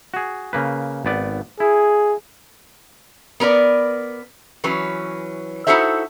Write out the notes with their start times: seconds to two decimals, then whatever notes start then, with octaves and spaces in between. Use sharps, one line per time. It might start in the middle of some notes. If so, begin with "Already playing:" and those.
0.14 F#4 G#4
0.53 C#3 A#3 B4
1.05 G#1 B3 D5
1.60 E4 G#4
3.40 B3 A#4 B4 D5
4.64 E3 F#3 C#4 B4
5.67 D#4 E4 F#4 A4 C5 E5